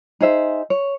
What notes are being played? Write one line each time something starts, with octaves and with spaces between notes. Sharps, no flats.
D#4 G#4 C5 E5
C#5